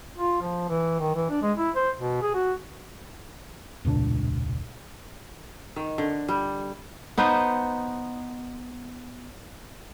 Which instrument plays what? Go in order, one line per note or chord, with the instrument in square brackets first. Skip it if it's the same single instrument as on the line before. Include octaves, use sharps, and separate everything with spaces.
[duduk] F4
F3
E3
D#3
E3
D4
G#3
E4
C5
B2
G#4
F#4
[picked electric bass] E1 C#2 A#2 D4
[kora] D#3
D3
G3
B3 D#4 B4 C5